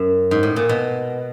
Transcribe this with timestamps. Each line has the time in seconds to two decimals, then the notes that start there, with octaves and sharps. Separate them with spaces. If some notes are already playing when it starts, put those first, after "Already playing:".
Already playing: F#2
0.31 G#2
0.43 A2
0.56 A#2
0.69 B2